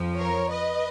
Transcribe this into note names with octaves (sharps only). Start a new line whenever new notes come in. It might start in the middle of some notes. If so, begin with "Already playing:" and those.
Already playing: F2 F3
A#4 C#5
B4 D#5